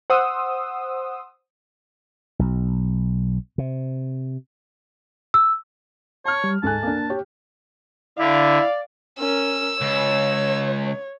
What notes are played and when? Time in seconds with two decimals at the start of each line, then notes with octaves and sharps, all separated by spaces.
0.10 C5 F#5 C6 D#6 E6
2.39 B1
3.58 C3
5.34 E6
6.25 C#5 A5 F6
6.44 G3
6.63 D2 G#2 A4 G#5 A5 F#6
6.83 A#3 D4
7.10 G4 C#5
8.19 D3 E4 D5 F5
9.19 C#4 A#4 E6
9.81 C#2 C#5